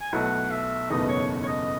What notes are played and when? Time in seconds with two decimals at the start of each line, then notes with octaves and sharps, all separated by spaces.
0.01 G#5
0.12 B1 B2 A3 E4 F#5
0.51 E5
0.90 F#1 E2 B2 A3 D#4 D#5
1.08 C#5
1.43 C#5
1.47 D#5